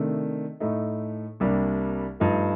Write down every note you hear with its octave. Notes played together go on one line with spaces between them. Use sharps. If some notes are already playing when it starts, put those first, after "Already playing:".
Already playing: C3 D#3 A3 D4
A2 A3 D#4
C2 C3 G3 A#3 D4
G2 F3 A3 D#4